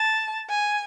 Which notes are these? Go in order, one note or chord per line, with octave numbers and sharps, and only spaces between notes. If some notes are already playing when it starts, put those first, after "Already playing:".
Already playing: A5
G#5